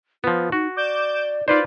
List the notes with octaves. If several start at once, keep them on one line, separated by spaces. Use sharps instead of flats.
F3 B3 F4
D#4 F#4
D5 D6 G6 E7
D#4 F4 B4 C5 D5